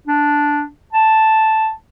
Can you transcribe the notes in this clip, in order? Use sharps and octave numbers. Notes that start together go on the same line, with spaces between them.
D4
A5